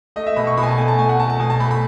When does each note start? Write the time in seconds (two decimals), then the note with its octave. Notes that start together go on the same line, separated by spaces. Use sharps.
0.16 A3 D#5
0.27 E5
0.37 B2 B5
0.47 C#6
0.57 B2 B5
0.63 G#5
0.68 A5
0.78 A3 G#5
0.88 A5
0.99 A3 G#5
1.09 F#5
1.19 A3 A5
1.30 A5
1.40 B2 G#5
1.50 A5
1.60 A3 B5
1.71 B5